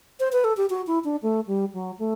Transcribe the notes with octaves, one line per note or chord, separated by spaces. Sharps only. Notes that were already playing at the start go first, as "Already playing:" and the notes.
C5
B4
A4
G4
F#4
E4
D4
A3
G3
F#3
A3